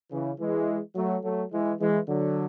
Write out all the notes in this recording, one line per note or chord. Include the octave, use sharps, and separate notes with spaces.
C#3 E3
E3 G#3
F#3 A3
F#3 A3
E3 G#3
E3 G#3
D3 F#3